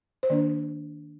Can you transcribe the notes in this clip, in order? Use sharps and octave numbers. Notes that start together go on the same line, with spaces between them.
C5
D#3 A#3 D4 D5